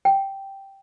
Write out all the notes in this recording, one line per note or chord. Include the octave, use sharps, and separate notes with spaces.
G5